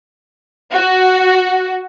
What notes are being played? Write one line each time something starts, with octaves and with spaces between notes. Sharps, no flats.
F#4